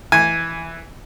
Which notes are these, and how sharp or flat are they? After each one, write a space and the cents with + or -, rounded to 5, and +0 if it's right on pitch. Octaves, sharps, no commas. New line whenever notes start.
E3 +0 G#5 -5